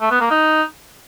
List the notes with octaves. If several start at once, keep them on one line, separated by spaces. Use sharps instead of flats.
A3
B3
A#3
D#4